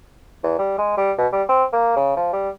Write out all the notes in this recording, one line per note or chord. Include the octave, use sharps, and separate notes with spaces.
E2
G3
G#3
G3
B2
G3
C4
A#3
C#3
F3
G3